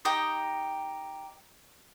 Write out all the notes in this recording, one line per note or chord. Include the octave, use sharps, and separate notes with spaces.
D#4 G4 G5 D#6